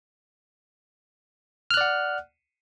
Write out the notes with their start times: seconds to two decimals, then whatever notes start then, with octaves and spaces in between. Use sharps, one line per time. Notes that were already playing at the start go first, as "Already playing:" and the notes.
1.71 F6
1.74 F#6
1.77 D5
1.81 F#5